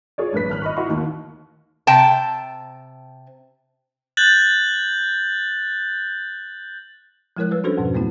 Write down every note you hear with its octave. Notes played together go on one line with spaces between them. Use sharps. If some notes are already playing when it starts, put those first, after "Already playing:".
F4 G#4 C#5 D5
A#1 G2 B4 B6
G#1 F6 F#6
D#5 B5 C#6
E4 F#4 D#5 E5 C6 C#6
D#2 D#3
C3 G5 A5
F#6 G6 A6 F#7
F3 G#3 E4 A#4 C#5 F#6
G3 B4 E6
C#4 D4 F#4 A4 B4 C5
F2 G#2 B2 F3
F#3 A3 B3 C4 E4